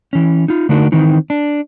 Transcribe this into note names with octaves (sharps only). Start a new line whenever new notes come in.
E3 C#4
D#4 F4
D3 A3 D4 D#4 F#4 A#4
D#3 E3 C4 D#4
D4